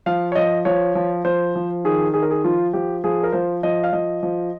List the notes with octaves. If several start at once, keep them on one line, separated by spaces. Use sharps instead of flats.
F3 F5
C#5
F3 D#5
F3 C#5
F3
F3 C5
F3
D#3 G#4
D#3 G#4
A#4
G#4
F3 F4
F3 G4
F3 G#4
A#4
F3 C5
F3 D#5
F5
F3 D#5
F3